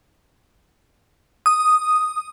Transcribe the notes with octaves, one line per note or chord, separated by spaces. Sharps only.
D#6